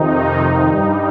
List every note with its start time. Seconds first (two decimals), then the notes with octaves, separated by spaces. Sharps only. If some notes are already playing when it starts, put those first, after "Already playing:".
Already playing: F2 C3 D#3 D#4
0.67 G2 G3